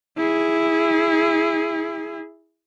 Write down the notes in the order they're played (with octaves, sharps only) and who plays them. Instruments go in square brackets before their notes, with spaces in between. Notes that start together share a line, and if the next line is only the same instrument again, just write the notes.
[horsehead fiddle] E4 G#4